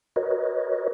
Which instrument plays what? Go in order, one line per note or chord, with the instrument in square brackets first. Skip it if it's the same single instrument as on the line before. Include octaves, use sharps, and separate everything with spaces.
[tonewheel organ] F#4 A#4 B4 C#5 D#5